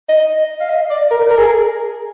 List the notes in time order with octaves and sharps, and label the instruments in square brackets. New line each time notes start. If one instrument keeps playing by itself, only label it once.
[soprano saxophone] D#5
F5
D#5
D5
A#4
A#4
G#4
A#4